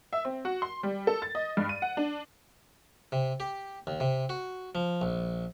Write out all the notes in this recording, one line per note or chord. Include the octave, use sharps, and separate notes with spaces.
E5
C4
F#4
C6
G3
A4
A6
D#5
G2
D#7
F#5
D4
C3
G4
D#2
C3
F#4
F3
A#1